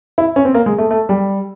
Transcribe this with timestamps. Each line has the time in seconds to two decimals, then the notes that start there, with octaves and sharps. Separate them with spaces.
0.18 E4
0.36 C#4
0.45 C4
0.54 A#3
0.66 G#3
0.78 A3
0.91 A3
1.09 G3